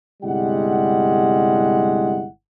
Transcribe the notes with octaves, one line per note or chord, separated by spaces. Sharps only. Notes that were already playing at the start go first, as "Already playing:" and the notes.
G1 C3 G3 G#3 E4 F#5